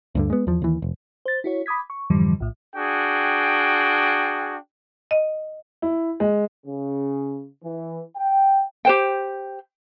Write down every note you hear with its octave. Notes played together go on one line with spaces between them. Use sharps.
D2 G2 D3
G#3 B3
E2 F3
D#2 E3
F1
C5 A6
E4 F#4 C#5
B5 D6 D#6 G#6 B6
C#6
F2 G#2 D3 E3 F3 G3
A#1 A2
D4 F#4 G#4 G5
D#5
E4
G#3
C#3
E3
G5
G4 C5 G5